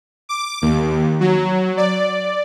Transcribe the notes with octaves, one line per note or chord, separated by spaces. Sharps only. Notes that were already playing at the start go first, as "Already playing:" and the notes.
D6
D#2
F#3
D5